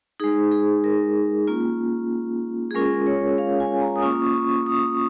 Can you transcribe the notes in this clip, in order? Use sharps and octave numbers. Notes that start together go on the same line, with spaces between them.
G#3 D#4 G#4
G#4
A#4
A#3 C#4 F4
G#4
G#3 C#4 F4 A#4
C#5
F5
G#5
A#5
D#6
A#3 C#4 F4 C#6
C#6
D#6